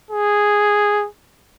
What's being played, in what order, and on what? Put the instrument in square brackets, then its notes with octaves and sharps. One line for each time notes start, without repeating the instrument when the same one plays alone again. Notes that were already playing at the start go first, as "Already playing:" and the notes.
[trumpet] G#4